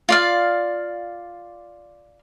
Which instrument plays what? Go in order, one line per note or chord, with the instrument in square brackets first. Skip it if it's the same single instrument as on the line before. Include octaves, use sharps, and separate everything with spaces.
[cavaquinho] F4 D5 F5